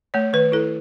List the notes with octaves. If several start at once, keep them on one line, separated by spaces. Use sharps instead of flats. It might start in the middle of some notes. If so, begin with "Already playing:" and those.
A3 C#5
D#3 B4
E4 A4